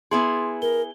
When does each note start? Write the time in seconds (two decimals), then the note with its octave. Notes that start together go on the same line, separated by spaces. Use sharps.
0.11 B3 E4 G#4 C6
0.62 A#4 G7